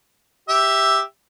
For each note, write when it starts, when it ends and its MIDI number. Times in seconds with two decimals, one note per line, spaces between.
0.49 1.00 67
0.49 1.00 76